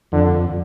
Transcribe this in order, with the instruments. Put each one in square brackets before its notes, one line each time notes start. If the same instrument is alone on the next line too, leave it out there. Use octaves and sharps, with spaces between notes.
[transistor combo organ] F2 [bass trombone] D3